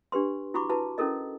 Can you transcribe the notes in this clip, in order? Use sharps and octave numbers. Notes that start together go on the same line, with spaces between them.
D4 G4 B4 C6
E4 F#4 A#5 B5 C#6 D6
E4 F#4 B4 A5
C#4 E4 A4 A#4 D#5